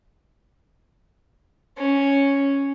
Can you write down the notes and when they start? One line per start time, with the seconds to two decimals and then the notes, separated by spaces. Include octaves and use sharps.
1.78 C#4